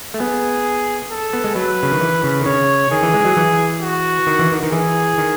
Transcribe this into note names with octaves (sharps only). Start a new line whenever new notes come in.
A3
B3 G#4
A4
B3
G#3
F#3 B4
C#3
D#3
E3
C#3
D#3
C#3 C#5
D#3 G#4
E3
G#3
F#3
E3
F#4
D#3
E3
D#3
D#3
E3 G#4
D#3